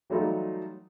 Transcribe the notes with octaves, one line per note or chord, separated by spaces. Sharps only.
E3 F#3 G3 A3 D#4 F4